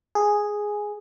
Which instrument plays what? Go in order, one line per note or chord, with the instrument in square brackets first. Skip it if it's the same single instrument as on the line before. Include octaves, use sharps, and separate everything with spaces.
[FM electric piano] G#4